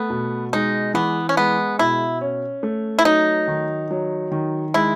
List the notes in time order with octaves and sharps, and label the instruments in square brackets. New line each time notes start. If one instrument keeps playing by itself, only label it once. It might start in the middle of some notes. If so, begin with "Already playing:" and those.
Already playing: [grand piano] A3 [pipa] B3
[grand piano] B2
[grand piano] G#3 [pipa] D#4
[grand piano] E3 [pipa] B3
[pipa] C#4
[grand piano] G#3 [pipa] B3
[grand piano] B2 [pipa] E4
[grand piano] C#4
A3
[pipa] E4
[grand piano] F#3 [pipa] D#4
[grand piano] D#3
F#3
D#3
[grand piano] G#3 [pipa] E4